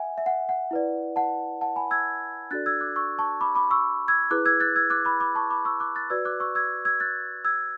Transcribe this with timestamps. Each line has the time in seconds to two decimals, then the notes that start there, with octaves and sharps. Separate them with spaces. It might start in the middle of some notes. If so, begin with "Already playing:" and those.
Already playing: E5 F#5 G#5
0.18 E5
0.26 F#5
0.49 F#5
0.71 E4 B4 D5
1.16 F#5 A5
1.61 F#5 A5
1.76 G#5 B5
1.91 E6 G#6
2.51 D4 F#4 A4 D5 F#6 A6
2.66 E6 G#6
2.81 D6 F#6
2.96 C#6 E6
3.19 A5 C#6
3.41 B5 D6
3.55 B5 D6
3.71 C#6 E6
4.08 E6 G#6
4.31 E4 G#4 B4 D6 F#6
4.46 E6 G#6
4.60 F#6 A6
4.76 E6 G#6
4.90 D6 F#6
5.05 B5 D6
5.20 B5 D6
5.35 A5 C#6
5.50 B5 D6
5.65 C#6 E6
5.80 D6 F#6
5.95 F#6 A6
6.10 F#4 B4 D5 E6 G#6
6.25 D6 F#6
6.40 C#6 E6
6.55 E6 G#6
6.85 E6 G#6
7.00 F#6 A6
7.45 E6 G#6